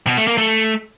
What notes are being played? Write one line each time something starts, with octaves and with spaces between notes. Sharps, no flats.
B2
A3
A#3
A3